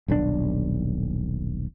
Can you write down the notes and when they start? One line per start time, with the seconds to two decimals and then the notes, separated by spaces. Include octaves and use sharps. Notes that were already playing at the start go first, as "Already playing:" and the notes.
0.08 D#1 B1 A#2 D4